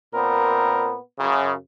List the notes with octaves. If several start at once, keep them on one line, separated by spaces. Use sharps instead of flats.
A#2 B3 C4 A#4
F#2 C#3